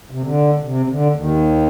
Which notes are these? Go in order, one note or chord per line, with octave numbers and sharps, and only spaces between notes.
C3
D3
C3
D3
D#2 D#3